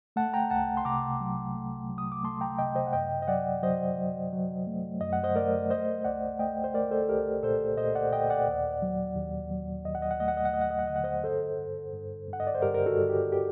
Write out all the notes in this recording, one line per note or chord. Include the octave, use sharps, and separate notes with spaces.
A3 F#5 A5
G5 A#5
C2 F#5 A5
C6
C3 A#5 D6
F#3
A3
F#3
D#6
D6
A3 A5 C6
G5 A#5
C3 D#5 G5
C5 D#5
F#5
F#2 D#5 G5
D#5
F#3 D5 F#5
F#3 C5 D#5
F#3
F#3
A3
F#2 D#5
F#5
C5 D#5
A3 A#4 D5
A3 C5 D#5
C2 D5 F#5
A3 D#5 G5
C5
A3 A#4 D5
A4 C5
A4
C2 G4 A#4
A#2 A4 C5
A#2 C5 D#5
D5 F#5
A#2 D#5 G5
D5 F#5
D#2
F#3
D#2
F#3
D#2 D#5
F#5
D#5
F#5
A3 D#5
F#5
D#5
F#5
A3 D#5
F#5
D#5
F#5
D3 D#5
F#5
C5 D#5
G2 A4 C5
G2
G2
G2
F#5
D#5
D5
C5
G2 G4 A#4
A#4
F#4 A4
G2
G4
G4